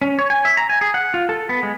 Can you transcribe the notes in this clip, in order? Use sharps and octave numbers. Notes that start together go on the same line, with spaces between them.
C#4
C#5
G#5
E5
A#5
G#5
G#4
F#5
F4
A4
B3
G#3